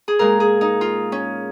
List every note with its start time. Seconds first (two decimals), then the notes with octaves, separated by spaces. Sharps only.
0.08 G#4
0.19 A#2 G#3 A#4
0.40 G#4
0.61 D#4
0.81 F4
1.12 C#4